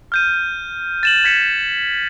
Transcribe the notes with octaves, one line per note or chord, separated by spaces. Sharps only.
F6 G6 D#7
A6 E7 F#7
G#6 B6 C#7